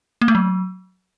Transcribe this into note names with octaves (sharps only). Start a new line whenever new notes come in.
A#3
A3
F#3